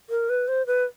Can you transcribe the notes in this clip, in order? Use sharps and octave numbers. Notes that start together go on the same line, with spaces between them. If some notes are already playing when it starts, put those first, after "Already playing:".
A#4
B4
C5
B4